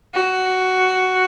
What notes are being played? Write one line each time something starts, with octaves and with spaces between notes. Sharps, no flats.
F#4